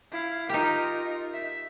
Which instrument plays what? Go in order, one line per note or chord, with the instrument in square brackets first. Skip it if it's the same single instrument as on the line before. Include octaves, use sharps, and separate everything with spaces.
[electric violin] E4 F5
[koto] D#4 G4 [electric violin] F4 A#4
[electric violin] E5